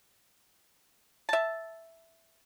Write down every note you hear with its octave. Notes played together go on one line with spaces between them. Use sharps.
E5 A5